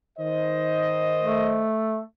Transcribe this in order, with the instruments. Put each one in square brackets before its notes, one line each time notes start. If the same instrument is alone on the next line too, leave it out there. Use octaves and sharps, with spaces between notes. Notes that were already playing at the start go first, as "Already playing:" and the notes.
[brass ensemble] D#3 C5 D#5
[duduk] A3